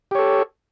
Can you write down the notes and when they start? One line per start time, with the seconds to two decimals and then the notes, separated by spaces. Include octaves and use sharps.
0.11 G4
0.15 C#5
0.19 A4